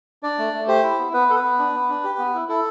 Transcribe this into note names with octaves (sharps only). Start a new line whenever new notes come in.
D4 D5
A3
A3
G4 C5
E4
B3
B3 B4
B3 A4
B4
B3
D4
B3
D4
G4
B3
E4
E4 A4